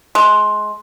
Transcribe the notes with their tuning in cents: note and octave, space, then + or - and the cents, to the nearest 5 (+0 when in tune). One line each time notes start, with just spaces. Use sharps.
G#3 +25